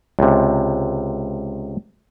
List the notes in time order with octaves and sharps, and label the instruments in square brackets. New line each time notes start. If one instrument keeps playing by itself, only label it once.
[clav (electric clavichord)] C#2 C3